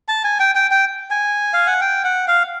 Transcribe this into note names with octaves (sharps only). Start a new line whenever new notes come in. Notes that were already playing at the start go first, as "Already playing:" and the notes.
A5
G#5
G5
G5
G5
G#5
F5
F#5
G5
F#5
F5